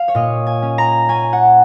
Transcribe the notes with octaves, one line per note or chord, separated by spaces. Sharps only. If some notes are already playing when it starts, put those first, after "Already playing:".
Already playing: F5
C#5
A#2 D#5
G#5
C#4
A#5
C#4 G#5
F#5